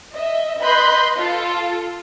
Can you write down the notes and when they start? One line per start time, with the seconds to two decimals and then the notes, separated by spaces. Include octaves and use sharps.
0.14 D#5 E5
0.61 B4 D#5 B5 C6 F#6 G6
1.16 F4 A4